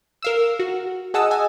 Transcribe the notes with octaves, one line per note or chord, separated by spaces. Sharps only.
A#4 F5 E6
F#4
G#4 D#5 F#5 A5 D#6 E6
D#5 G#5